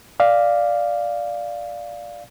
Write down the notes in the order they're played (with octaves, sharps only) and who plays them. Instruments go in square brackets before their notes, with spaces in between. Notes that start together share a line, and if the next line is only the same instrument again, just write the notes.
[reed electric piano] D5 F5